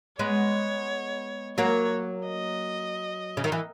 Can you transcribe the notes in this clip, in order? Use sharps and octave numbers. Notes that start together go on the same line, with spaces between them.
G#3 B3 C#5
F#3 A#3 C#5
D#5
C#3
D#3
E3